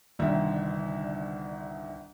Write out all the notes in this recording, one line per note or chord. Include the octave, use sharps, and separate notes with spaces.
G1 C2 D3 D#3 E5